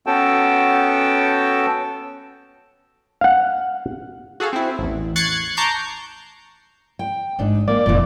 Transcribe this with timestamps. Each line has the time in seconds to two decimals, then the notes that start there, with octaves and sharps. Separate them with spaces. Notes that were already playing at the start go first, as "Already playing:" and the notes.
0.06 B3 C#4 F#4 A4 G5 A5
3.21 F5 F#5
4.40 F#4 G#4 A4 F5
4.53 C4 E4
4.79 A1 E2
5.16 C#6 F#6 G#6 A6 C7 C#7
5.57 A5 A#5 C#6 D6 G6 C7
6.99 G5
7.39 A1 G#2 D4 D#4
7.68 A#3 D5
7.86 F1 A#2 E3 F3